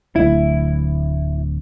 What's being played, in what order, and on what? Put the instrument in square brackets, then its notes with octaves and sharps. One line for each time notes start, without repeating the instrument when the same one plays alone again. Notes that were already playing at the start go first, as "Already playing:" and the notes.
[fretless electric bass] D1 D2 A3 [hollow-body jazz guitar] E4